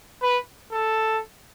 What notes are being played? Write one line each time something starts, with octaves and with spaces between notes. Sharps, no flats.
B4
A4